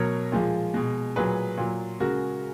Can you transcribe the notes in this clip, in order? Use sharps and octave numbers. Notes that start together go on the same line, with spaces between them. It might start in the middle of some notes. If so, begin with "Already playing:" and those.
Already playing: B2 F#3 A#4 C#5
A#2 F3 G#3
B2 G#3
A#2 F#3 G#4 B4
A#2 F#3
C#3 G#3 F#4 A#4